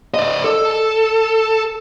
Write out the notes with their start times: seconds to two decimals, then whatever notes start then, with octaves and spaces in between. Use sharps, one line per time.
0.14 D5 D#5
0.44 A4